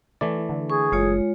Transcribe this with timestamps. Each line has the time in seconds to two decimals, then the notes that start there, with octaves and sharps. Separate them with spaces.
0.21 E3 A3 E4 D5
0.49 D3
0.70 G#4 C#6
0.92 F#1 G#3 F4 C#5